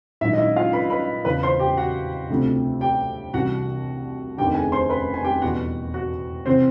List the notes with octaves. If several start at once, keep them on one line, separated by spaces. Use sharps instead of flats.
A#1 G#2 D#3 F#3 E4 E5
D#5
E4 E5
F4 F5
B4 B5
B4 B5
E2 C#3 F3 B4 B5
C5 C6
G4 G5
F#4 F#5
D2 C3 F3 A3 C4
G4 G5
C2 C3 E3 G3 F#4 F#5
F1 D#2 D3 G4 G5
G#4 G#5
C5 C6
B4 B5
G#5
G4 G5
E2 B2 G3 B3 F#4 F#5
F#4 F#5
C3 E3 C4 C5